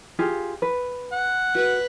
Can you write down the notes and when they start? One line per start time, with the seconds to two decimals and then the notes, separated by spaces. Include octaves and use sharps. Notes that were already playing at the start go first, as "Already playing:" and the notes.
0.19 F4 G4 G#4
0.62 B4
1.12 F#5
1.55 F#4 B4